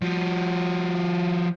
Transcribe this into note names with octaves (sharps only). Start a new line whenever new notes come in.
F3 F#4